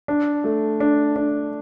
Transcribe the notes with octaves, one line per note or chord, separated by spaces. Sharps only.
D4
A3
D4
D4